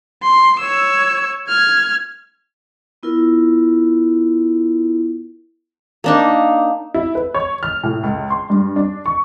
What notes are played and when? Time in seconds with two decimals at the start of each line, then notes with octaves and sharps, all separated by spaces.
0.23 C6
0.59 C#5 E6
1.48 F6 G#6
3.03 B3 E4 F4 A#4
6.04 A#3 D4 D#4
6.94 E4
7.15 B4
7.35 C#5
7.63 F6
7.83 A2
8.03 C#2
8.30 C6
8.50 G2
8.76 D4
9.06 C#6